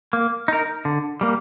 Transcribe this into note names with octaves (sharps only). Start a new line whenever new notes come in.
A#3
D#4 A#4
D3
G3 A#3